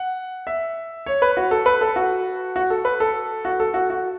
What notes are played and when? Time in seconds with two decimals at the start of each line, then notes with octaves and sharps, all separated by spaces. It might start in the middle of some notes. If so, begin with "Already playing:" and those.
Already playing: F#5
0.47 E5
1.06 C#5
1.22 B4
1.37 F#4
1.51 A4
1.66 B4
1.81 A4
1.96 F#4
2.56 F#4
2.70 A4
2.85 B4
3.00 A4
3.45 F#4
3.60 A4
3.74 F#4
3.90 F#4